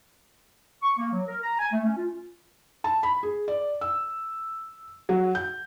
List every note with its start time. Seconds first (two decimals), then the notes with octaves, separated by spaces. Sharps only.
0.83 C#6
0.98 A#3
1.12 F#3
1.28 A#4
1.43 A#5
1.59 G#5
1.72 A3
1.85 C#4
1.97 F4
2.84 A5
3.03 B5
3.23 G#4
3.48 D5
3.81 E6
5.09 F#3
5.35 G6